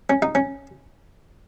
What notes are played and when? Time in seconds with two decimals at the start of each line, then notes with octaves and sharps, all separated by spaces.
0.10 C#4
0.22 D#4
0.35 C#4